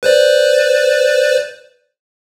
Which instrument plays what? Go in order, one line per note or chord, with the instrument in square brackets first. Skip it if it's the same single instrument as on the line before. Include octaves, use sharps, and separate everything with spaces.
[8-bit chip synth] B4 C5 D5